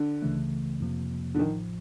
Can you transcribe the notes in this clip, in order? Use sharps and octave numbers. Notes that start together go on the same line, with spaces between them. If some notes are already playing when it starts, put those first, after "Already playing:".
Already playing: D3
C#2 C#3 E3 A3
F2 C3 F3 A#3
D3
A1 A2 D#3 F3